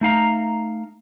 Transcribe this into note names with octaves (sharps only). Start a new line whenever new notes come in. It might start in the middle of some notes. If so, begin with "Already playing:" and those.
A3 D#4 F5 A#5